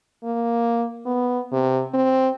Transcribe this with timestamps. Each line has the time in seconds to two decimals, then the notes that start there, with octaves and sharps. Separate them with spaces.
0.24 A#3
1.06 B3
1.53 C3
1.94 C4